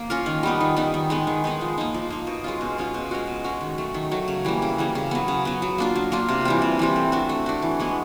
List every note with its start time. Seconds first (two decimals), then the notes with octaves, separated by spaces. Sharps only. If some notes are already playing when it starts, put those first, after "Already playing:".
Already playing: A#3
0.10 C#4 F4 A#4
0.26 D#3
0.43 G3 B3 D#4
0.60 D#3
0.76 G3 B3 D#4
0.94 D#3
1.10 G#3 B3 D#4
1.27 D#3
1.44 G#3 B3 D#4
1.61 F3
1.78 A#3 D#4
1.94 F3
2.10 A#3 D#4
2.27 B2
2.44 G#3 C#4 F4
2.61 B2
2.78 G#3 C#4 F4
2.94 B2
3.11 G#3 C#4 F#4
3.27 B2
3.44 G#3 C#4 F#4
3.61 D#3
3.78 F#3 A3
3.94 D#3
4.11 F#3 A3
4.28 C#3
4.45 E3 G3 A#3
4.62 C#3
4.78 E3 G3 A#3
4.95 C#3
5.11 F#3 B3
5.28 C#3
5.45 F#3 B3
5.62 F#3
5.78 A#3 D4 F4
5.95 F#3
6.12 A#3 D4 F4
6.29 C3
6.45 E3 G3 C4
6.62 C3
6.79 E3 G3 C4
6.96 A3
7.12 D4 F#4
7.29 A3
7.46 D4 F#4
7.62 E3
7.80 G#3 B3 E4